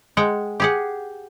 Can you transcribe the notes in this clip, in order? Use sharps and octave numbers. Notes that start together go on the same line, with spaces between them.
G#3 F#5 G5
G4 G#4 F#5